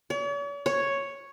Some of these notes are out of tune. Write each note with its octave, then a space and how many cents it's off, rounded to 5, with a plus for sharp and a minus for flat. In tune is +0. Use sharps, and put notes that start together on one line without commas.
C#5 +45
C#5 +0